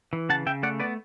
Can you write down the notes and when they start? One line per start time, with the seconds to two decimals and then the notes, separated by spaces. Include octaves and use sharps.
0.13 E3
0.29 C#3 F#5 A5
0.46 C#3 E5 G5
0.63 A3 D5 F#5
0.80 B3 B4 D5